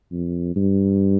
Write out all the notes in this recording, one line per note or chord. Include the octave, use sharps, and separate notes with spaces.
F2
G2